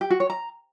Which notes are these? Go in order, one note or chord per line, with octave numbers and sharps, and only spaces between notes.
G4
F#4
C#5
A#5